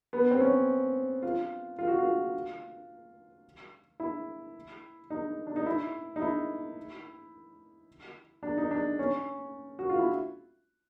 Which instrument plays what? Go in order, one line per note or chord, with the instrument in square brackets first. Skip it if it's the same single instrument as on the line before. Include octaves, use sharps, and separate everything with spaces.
[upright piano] B3
C4
C#4
F4
F4
F#4
F4
E4
D#4
D4
D#4
E4
D#4
E4
D4
D#4
D4
C#4
F#4
F4
E4